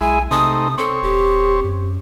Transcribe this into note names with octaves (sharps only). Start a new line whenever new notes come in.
B1 G#3 E4 G#5
C3 A3 C4 D#4 D#6
C4 A4 C#5
D#1 G4
F#2